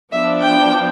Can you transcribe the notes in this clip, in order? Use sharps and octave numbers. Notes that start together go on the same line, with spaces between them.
F3 B3 D4 E5
G5